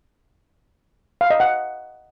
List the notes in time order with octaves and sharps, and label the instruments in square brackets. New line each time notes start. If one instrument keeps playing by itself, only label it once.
[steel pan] F5
D#5
F#5